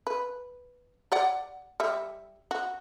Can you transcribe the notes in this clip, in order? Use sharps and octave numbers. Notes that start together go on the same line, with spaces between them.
B4
G4 D5 F#5
G3 E5
F#4